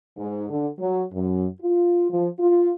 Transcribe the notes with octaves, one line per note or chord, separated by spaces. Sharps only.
G#2
D3
F#3
F#2
F4
F3
F4